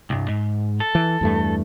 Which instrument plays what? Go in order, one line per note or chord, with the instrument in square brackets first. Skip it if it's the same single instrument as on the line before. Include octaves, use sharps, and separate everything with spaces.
[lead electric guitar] C2 G2
G#2
A4
[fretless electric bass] E3
E2 G2 A3